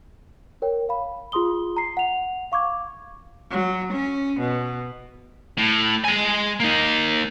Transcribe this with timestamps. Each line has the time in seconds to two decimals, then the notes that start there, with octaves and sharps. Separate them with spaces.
0.62 A#4 C#5 G5
0.89 F5 B5
1.32 F4 G#4 C6 D#6 G7
1.77 A#5 C7
1.97 F#5 F7
2.52 F5 C#6 D6 G#6
3.51 F#3
3.92 C#4
4.40 B2
5.58 A2
6.05 G#3 G#5
6.60 A#3 D#4